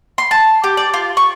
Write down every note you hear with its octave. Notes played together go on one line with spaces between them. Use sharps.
C6
A5
G4
D5
F4
C#6